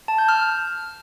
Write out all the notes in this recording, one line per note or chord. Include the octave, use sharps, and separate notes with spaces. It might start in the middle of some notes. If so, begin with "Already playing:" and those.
A5
G6
F6